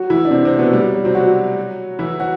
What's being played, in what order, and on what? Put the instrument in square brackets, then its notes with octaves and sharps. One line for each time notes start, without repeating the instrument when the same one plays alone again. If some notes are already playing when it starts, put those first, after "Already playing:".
Already playing: [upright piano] F#3 F#4
E3 E4
D4
C3 C4
C3 C4
B2 B3
G3
F#3
F#3
C3 C4
F#3 F#4
E3 E4
F#3 F#4